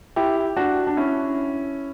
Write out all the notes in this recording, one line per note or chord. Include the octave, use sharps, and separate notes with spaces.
E4 G4
D4 F#4
D4
C#4 E4